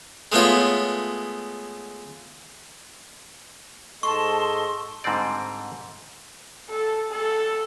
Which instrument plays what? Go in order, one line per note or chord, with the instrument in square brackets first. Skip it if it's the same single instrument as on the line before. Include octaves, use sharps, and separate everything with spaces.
[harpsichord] G#3 A3 B3 F4 C#5
[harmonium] G#2 A4 D#5 [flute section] A5 [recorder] C6 [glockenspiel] C#6
[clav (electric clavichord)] G#2 D3 G3 C4 D5
[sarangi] A4
A4